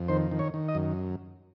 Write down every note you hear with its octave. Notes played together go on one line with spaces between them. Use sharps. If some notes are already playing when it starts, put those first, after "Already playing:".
Already playing: F2
D#3 C5
D#3
C#5
D#3
D#5
F#2